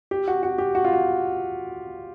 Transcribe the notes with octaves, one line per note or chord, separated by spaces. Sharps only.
G4
F#4
F#4
G4
F#4
F4
F#4